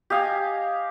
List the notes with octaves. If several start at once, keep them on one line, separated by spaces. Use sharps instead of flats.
G4 D#5 F5 G#5